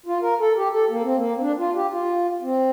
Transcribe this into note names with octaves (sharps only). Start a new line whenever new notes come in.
F4
A#4
A4
G4
A4
A#3
C4
A#3
C4
D4
F4
G4
F4
C4